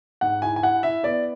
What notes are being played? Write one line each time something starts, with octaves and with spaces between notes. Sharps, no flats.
G#2 F#5
E4 G#5
G#5
E4 F#5
E4 E5
B3 D5